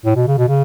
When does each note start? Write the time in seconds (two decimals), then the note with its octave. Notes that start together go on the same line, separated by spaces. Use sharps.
0.05 A2
0.16 B2
0.27 C#3
0.38 B2
0.48 C#3